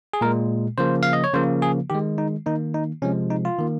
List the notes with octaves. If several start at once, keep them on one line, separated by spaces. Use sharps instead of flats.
G#4
A#2 G#3 A#4
C#3 F3 A#3 C5
F5
D#5
C#5
C#3 F3 A#3 C5
G#4
D#3 G#3 G4
D#4
D#3 A#3 D#4
D#4
C3 F3 G#3 C#4
D#4
F4
D#3 A#3